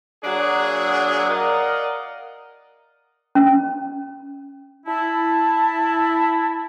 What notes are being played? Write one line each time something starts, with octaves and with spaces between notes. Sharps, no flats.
F#3 A#3 D4 F#4 G#4
A#4 D5 D#5 F5 F#5
C#4
E4 A5